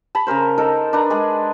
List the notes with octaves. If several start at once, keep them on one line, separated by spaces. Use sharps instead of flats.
A5 B5
C#3 G#4 A#4 C5
D#4 A4 A#4
D4 B4 A#5
G#3 G#4